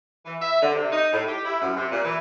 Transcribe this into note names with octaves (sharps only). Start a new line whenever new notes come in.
E3
E5
D3
C3
D#4
A2
G4
E4
F#2
C3
A#2
E3